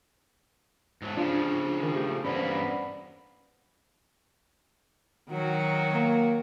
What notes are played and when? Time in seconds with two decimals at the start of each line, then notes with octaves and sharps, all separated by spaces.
1.02 G#2 F#3 A3
1.17 C#3 F3 C#4 D4 F4
1.81 D#3
1.95 A3 G4
2.25 E2 G2 A#3 B3 C#4 C5 D5 B5
5.30 D#3 F#3 F#4
5.93 A#3